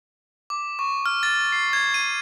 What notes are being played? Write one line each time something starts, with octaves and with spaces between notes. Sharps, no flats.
D6
C#6
F6
A6
C7
G#6
D#7